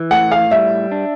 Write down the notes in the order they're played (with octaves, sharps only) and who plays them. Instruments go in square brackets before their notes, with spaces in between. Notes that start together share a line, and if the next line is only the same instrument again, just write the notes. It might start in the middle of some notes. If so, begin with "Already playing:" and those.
Already playing: [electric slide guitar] E3
[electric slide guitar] A2 [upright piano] F#5
[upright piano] F5
[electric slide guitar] G3 [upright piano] E5
[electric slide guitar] D4